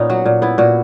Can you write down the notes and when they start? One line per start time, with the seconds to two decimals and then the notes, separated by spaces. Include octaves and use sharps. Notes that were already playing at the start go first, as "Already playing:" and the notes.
Already playing: A#2 B3 C#4 D#4
0.10 F#3 F#4
0.26 A#2
0.42 B3 E4
0.58 A#2 F#4